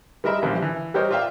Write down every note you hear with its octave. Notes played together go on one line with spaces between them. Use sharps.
G3 G#3 A#4 D#5 E5 B5
A#1 E3 F3 G3
E3
G3 G4 A#4 C5 C#5 D#5
F4 D5 E5 F5 G5